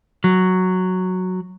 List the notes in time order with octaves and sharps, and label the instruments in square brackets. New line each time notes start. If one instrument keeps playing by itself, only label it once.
[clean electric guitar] F#3